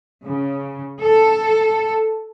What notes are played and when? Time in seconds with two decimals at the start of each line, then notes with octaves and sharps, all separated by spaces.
0.24 C#3
1.00 A4